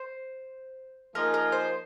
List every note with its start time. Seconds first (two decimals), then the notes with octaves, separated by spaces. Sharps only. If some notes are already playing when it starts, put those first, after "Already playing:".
Already playing: C5
1.15 F3 A#3 D#4 G#4 A#4
1.34 A#4
1.52 C5